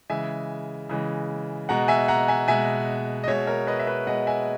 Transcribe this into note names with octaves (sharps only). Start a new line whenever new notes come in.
C#3 E3 G#3 E5 G#5
C#3 E3 G#3
B2 G#3 F#5 A#5
E5 G#5
F#5 A#5
E5 G#5
B2 G#3 E5 G#5
D#5
B2 G#3 C#5 E5
A#4 C#5
B4 D#5
E5
B4 D#5
B2 G#3 D#5 F#5
E5 G#5